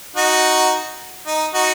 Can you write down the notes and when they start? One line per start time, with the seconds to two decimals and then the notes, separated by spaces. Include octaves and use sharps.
0.16 D#4 F#4
1.27 D#4
1.54 D#4 F#4